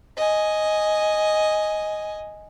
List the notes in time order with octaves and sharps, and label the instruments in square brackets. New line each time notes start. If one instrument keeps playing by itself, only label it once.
[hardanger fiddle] D#5 G#5